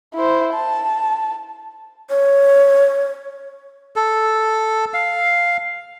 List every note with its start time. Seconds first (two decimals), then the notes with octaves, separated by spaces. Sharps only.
0.15 E4 C5
0.54 A5
2.10 C#5
3.96 A4
4.94 F5